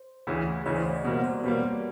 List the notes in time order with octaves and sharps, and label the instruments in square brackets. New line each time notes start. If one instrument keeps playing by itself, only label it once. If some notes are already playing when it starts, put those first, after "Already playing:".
Already playing: [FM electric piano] C5
[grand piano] D2 C#3 E3
[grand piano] D2 C#3 E3 [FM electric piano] C#5 D#5
[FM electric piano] C5 D5
C#5 D#5
C5 D5
[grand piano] B2 G3 A#3
[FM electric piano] C5 D5
[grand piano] B2 G3 A#3 [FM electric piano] B4 C#5